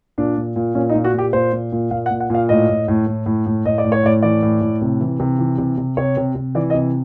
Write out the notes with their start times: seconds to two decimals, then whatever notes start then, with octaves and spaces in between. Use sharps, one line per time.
0.18 A#2 D4
0.37 A#2
0.56 A#2
0.75 A#2 C#4
0.89 D#4
0.95 A#2
1.04 F#4
1.14 A#2 G4
1.33 A#2 C5
1.52 A#2
1.72 A#2
1.91 A#2 F5
2.06 F#5
2.11 A#2
2.20 F#5
2.30 A#2 F5
2.49 A2 D#5
2.69 A2
2.88 A2
3.07 A2
3.26 A2
3.46 A2
3.65 A2 D#5
3.78 D5
3.84 A2
3.92 C#5
4.03 A2 D5
4.23 E3 D5
4.43 A2
4.61 A2
4.81 C3
5.01 E3
5.20 C3
5.39 E3
5.58 C3
5.78 C3
5.97 C3 C#5
6.17 C3
6.35 C3
6.55 E3 D5
6.70 D#5
6.74 C3